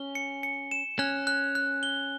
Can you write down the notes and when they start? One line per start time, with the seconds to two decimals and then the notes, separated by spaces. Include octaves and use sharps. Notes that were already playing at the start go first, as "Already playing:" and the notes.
Already playing: C#4 G7
0.15 C#7
0.43 C#7
0.71 E7
0.99 C#4 F#6
1.27 F#6
1.55 F#6
1.83 G7